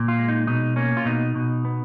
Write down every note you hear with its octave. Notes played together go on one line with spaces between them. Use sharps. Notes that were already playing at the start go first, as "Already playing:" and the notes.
Already playing: A#2
F4
G#3
D#4
B2 D#4
A#3 C#4
F4
B2 D#4
B2
B3